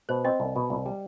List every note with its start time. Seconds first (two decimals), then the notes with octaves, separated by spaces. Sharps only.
0.09 B2 C5
0.25 C4 D#5
0.40 C2
0.56 B2
0.70 C2
0.86 G3